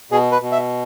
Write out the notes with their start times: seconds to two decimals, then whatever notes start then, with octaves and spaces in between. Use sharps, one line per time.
0.11 B2 G#4
0.32 B4
0.42 B2
0.52 E5